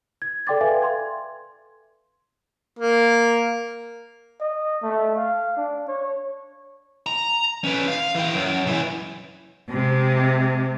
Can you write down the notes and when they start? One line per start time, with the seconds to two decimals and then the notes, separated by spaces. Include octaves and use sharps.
0.22 G#6
0.47 A4 D5 G5 C6 D6 A6
0.61 A4 B4 E5 F5 G#5
0.82 C6 G#6
2.79 A#3
4.40 D#5
4.83 A3
5.17 F5
5.57 D4
5.88 C#5
7.07 A#5
7.65 C#4 B4
7.88 F5
8.15 E3 G5
8.35 F#2
8.66 C#2 E3
9.70 C3 G#3